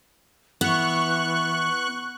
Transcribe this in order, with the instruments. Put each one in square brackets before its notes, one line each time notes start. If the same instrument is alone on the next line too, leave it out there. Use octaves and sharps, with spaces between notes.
[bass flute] E3 [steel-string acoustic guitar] B3 [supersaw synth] C#6 F#6